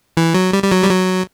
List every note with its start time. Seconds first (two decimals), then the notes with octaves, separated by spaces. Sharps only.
0.17 E3
0.34 F#3
0.53 G3
0.63 G3
0.72 F#3
0.83 G3
0.90 F#3